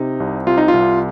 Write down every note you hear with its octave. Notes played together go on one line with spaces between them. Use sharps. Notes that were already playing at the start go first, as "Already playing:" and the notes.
Already playing: C3 D#4
C2
C3 F4
D#4
F4
C2